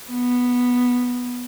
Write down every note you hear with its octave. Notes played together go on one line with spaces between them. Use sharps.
B3